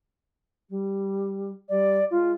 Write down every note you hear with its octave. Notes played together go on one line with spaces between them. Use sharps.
G3
G3 D5
G#3 F4